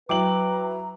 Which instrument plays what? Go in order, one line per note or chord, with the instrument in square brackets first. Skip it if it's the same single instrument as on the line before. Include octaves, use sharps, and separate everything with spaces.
[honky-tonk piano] F#3 E4 F#7 [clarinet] B4 [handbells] G5 D6 [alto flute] A#5